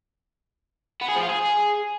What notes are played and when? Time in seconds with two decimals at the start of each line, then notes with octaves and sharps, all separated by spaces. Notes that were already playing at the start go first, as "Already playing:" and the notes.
1.02 B3
1.09 G#4
1.16 F3
1.23 F4
1.30 G#4